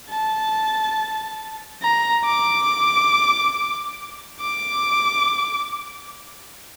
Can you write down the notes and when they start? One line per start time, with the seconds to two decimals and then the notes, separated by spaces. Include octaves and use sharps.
0.11 A5
1.82 A#5
2.25 D6
4.41 D6